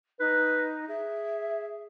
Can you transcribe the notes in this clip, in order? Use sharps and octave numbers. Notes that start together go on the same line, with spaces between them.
D#4 B4
G#4 E5